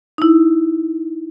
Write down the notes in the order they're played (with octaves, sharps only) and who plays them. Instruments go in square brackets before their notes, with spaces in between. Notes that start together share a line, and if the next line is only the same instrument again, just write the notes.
[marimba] D#4 E4